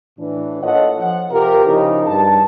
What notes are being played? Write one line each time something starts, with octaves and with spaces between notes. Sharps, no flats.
A2 E3 D4
A#3 F4 A4 C#5 D#5 F#5
F3 F#5
C3 F4 G4 A#4
C#3 F3 D#4 E4 G4
G2 A5